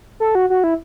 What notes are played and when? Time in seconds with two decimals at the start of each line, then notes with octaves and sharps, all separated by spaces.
0.20 A4
0.35 F#4
0.50 F#4
0.64 E4